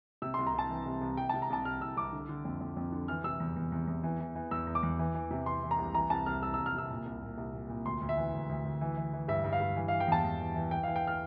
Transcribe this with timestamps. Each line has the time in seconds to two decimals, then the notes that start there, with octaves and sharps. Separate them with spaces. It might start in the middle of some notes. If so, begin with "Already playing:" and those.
0.22 C3 E6
0.34 C6
0.39 C2
0.47 A#5
0.54 C2 A5
0.70 E3
0.86 C2
1.01 C2
1.17 C2 G5
1.29 A5
1.34 C3
1.42 A#5
1.50 C2 A5
1.65 C2 F6
1.81 C2 E6
1.97 C2 D6
2.13 D3
2.29 D3
2.45 F2
2.61 F2
2.77 F2
2.92 D3
3.08 E3 F6
3.24 C3 E6
3.40 E2
3.56 E2
3.72 E2
3.87 E2
4.03 E3
4.20 E3
4.35 E3
4.51 E2 E6
4.67 E2
4.75 D6
4.83 E2
4.99 E3
5.15 E3
5.31 C3
5.46 E3 C6
5.63 E3
5.71 A#5
5.78 C2
5.95 E3 A#5
6.10 C2 A5
6.26 C2 F6
6.42 C2 E6
6.54 E6
6.58 C2
6.66 F6
6.74 C3 E6
6.90 A#2
7.06 C2
7.22 A#2
7.38 C2
7.54 A#2
7.69 A#2
7.85 D2 C6
8.01 D2
8.09 E5
8.17 E3
8.33 D2
8.49 D2
8.65 D2
8.81 E3
8.97 E3
9.13 E3
9.28 G2 E5
9.44 G2
9.53 F5
9.60 G2
9.76 E3
9.88 E3 F5
10.00 G5
10.08 E2 A5
10.25 E2
10.39 E3
10.55 E3
10.71 E3 G5
10.83 F5
10.88 E3
10.96 G5
11.07 F6